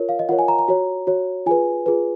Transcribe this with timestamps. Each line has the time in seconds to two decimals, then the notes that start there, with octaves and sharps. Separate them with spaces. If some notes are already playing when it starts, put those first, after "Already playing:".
Already playing: F4 A#4 C#5
0.09 F5
0.19 D#5
0.29 F4 A#4 C#5 F#5
0.39 G#5
0.48 A#5
0.59 A#5
0.68 F#4 C#5
1.07 F#4 C#5
1.46 F4 G#4 B4 G#5
1.86 F4 G#4 B4